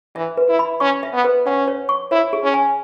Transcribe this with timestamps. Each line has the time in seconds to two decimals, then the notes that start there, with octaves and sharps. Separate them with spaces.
0.16 E3 E5
0.37 B4
0.49 E4
0.59 B5
0.80 C#4 C#6
1.03 E5
1.14 B3
1.25 B4
1.46 C#4 F#5
1.68 C#5
1.89 C#6
2.11 E4 C#5
2.33 G#4
2.44 C#4
2.54 G#5